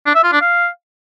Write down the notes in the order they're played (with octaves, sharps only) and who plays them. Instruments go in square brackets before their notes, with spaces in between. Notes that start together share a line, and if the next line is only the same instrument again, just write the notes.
[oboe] D4
E5
F4
D4
F5